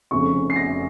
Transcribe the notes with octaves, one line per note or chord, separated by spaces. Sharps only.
F1 F2 C#3 C#6
C7
A#6